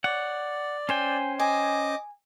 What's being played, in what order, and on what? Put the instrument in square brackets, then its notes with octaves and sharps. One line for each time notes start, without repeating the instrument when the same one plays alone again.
[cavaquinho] C#5 [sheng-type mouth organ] D5 [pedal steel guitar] F#5
[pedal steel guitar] C#4 C5 G5 [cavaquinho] G#5
[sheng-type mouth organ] D#5 D6 [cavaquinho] G#5